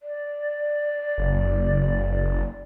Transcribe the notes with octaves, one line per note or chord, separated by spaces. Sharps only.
D5
F#1